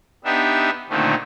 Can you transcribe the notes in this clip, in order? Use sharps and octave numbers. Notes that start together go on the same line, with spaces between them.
B3 D4 D#4 G4 E5
A#2 D3 D#3 A3 C4